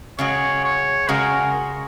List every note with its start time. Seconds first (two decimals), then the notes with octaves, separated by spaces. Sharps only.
0.19 C#3 G#3 F#4 C#5
0.64 C#5
1.09 C#3 G#3 F#4 A#4